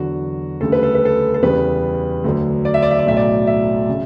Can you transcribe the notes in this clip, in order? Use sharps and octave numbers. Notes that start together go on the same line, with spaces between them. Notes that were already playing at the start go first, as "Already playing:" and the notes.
Already playing: E2 D3 F#3 F#4
D2 C#3 G3 A4
B4
A4
B4
A4
A4
E2 C#3 G3 B4
D2 D3 F#3
D5
E5
D5
E5
D5
B1 A2 F#3 E5
D5
E5
C#3